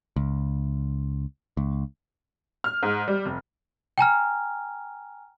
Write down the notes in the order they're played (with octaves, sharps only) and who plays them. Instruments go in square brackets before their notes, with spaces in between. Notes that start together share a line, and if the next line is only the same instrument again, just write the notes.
[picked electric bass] C#2
C#2
[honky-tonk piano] F6
G#2
G3
F1
[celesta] G5 G#5 A#5 F6